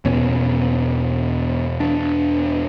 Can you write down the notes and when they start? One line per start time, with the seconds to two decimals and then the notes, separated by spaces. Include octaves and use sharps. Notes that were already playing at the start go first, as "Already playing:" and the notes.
0.05 E2 B2 C#4
1.80 D4